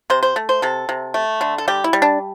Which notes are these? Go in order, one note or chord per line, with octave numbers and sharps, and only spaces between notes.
C3 C5
C5
A3
C5
C3 A4
C3
A3
D3
A4
G3 G4
E4
G3
D4